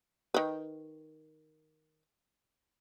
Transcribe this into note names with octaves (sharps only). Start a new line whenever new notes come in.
D#3 B4